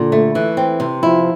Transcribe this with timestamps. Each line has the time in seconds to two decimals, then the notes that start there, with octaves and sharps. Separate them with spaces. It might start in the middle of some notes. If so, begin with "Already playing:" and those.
Already playing: A#2 D3
0.12 A3
0.35 E3
0.57 C4
0.80 C3
1.03 F3 E4